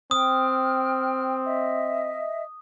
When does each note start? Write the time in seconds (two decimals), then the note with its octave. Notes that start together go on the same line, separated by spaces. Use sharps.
0.11 C4 G5 D#6 F6
1.44 D#5 E5